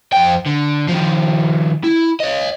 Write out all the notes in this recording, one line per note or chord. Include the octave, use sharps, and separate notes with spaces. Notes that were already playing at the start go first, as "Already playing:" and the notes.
F2 G5
D3
D#3 F3
E4
C#5 D#5